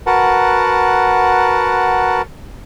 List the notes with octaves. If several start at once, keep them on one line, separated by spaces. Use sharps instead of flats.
F#4 A#4 B4 F#5 A5